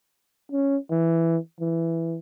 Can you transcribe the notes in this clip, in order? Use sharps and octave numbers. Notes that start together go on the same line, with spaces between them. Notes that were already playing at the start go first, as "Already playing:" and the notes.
C#4
E3
E3